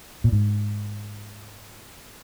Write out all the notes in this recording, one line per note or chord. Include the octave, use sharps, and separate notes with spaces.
A#2
G#2